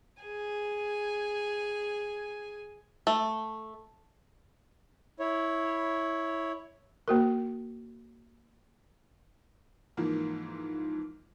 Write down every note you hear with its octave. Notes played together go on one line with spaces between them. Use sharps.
G#4 G#5
A3
E4 C#5
A#3 F#4 A#4
G#2 E3 F3 A#3 F4